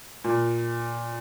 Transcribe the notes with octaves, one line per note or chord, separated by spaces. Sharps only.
A#2